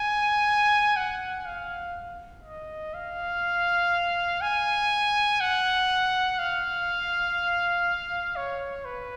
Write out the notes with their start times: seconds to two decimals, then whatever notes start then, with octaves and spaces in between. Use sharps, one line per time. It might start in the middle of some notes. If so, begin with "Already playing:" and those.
Already playing: G#5
0.96 F#5
1.46 F5
2.44 D#5
2.94 F5
4.41 G#5
5.40 F#5
6.39 F5
8.36 C#5
8.85 B4